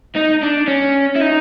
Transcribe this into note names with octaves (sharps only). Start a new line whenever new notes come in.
D#4
D4
C#4
E4
D#4